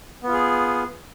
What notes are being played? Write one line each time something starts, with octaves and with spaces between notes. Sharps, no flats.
B3 F4 G#4